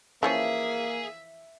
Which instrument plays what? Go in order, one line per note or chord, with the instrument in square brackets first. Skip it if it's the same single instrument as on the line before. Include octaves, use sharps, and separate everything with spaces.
[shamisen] E3 F3 C#4 [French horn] A#3 [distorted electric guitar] G#4 [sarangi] E5